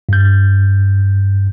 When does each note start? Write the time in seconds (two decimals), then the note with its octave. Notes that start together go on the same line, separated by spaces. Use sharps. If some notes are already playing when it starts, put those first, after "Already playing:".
0.09 G2 G6